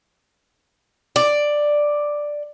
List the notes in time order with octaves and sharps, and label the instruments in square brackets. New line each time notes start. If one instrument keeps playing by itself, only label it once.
[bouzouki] D5